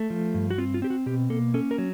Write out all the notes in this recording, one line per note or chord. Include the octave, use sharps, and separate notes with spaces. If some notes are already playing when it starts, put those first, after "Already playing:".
Already playing: A3
F3
G2
F#4
C4 F4
F4
C4 G4
F#4
B2 G4
A#3 A4
C#4 A4
A#4
F#3